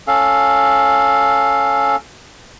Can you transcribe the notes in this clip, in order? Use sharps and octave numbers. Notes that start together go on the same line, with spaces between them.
C#4 A4 F5